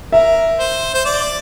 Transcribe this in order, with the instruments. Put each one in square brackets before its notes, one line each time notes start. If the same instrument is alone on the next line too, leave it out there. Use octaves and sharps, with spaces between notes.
[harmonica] A#4 [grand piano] E5
[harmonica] C5
C5
D5